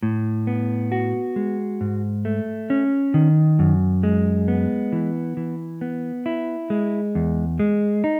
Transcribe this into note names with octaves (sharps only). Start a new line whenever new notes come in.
A2
B3
F#4
G#3
G#2
A3
C#4
D#3
F#2
G#3
B3
E3
E3
B3
E4
G#3
E2
G#3
D#4